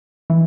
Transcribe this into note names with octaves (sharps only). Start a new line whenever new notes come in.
E3